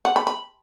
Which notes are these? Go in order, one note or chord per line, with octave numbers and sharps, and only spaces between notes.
F#5
B5
B5